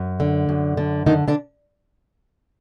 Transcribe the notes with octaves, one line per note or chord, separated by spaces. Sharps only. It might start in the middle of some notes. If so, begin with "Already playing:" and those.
Already playing: F#2
D3
F#2
D3
D3 D#3 D#4
D3 D4